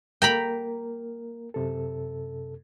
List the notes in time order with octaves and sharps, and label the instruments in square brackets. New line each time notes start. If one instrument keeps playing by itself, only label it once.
[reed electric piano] A#3 A#4 [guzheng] G5 A#5 B5
[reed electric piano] F#2 C3 A4